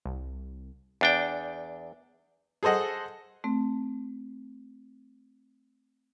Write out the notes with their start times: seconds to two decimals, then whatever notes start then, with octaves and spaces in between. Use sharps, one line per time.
0.06 C2
1.01 E2 D4 G5
2.63 G#4 A4 C5 D#5 F#5
3.44 A3 C4